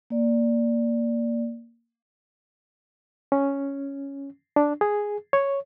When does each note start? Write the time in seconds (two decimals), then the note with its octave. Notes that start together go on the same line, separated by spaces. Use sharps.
0.10 A#3 D5
3.32 C#4
4.56 D4
4.81 G#4
5.33 C#5